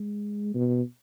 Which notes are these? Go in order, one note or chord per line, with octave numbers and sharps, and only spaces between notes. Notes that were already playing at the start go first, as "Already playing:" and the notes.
Already playing: G#3
B2